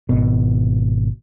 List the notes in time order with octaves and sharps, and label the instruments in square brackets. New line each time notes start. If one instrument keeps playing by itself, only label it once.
[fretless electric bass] G#1 B2